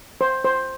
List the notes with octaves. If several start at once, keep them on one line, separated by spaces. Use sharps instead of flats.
C5
C5